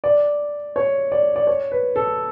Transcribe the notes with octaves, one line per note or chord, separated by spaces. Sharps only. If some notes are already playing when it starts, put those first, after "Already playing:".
D5
C#5
D5
D5
C#5
B4
A4